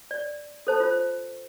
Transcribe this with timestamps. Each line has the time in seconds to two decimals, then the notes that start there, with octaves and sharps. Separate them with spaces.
0.11 D5
0.67 A4 C5 A5
0.80 F4 C5